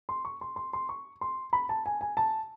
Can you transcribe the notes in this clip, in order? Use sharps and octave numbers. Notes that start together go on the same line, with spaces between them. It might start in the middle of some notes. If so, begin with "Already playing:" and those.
C6
C#6
C6
C6
C6
C#6
C6
B5
A5
G#5
G#5
A5